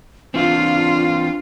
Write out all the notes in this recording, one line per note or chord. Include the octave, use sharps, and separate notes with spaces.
E3 C4 D4 F4